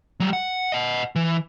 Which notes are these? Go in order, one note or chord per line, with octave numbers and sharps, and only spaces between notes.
F#3 G3
F#5
D#5 F#5
E3